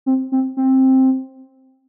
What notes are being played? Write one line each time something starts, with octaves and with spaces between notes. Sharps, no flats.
C4
C4
C4